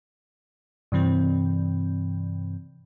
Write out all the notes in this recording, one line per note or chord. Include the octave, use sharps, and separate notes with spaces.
G2 C3 E3 C4